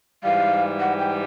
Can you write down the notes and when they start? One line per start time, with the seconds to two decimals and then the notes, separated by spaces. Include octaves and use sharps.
0.24 G#2 E3 G3 F5
0.80 F#5
0.99 G5